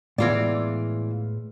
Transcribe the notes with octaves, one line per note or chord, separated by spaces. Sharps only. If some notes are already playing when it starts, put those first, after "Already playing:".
A2 E3 G#3 B3 F4 D5